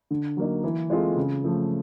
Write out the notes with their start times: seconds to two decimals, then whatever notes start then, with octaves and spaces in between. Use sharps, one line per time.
0.11 D3
0.37 F#3 A#3 D#4
0.64 E3
0.90 G#3 C4 F4 A4
1.16 C#3
1.44 F3 A3